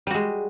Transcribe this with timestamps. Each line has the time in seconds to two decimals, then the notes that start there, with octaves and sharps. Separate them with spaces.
0.07 G3
0.11 F#4
0.14 G#3